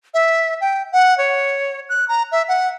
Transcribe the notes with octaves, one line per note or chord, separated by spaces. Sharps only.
E5
G5
F#5
C#5
F#6
A#5
E5
F#5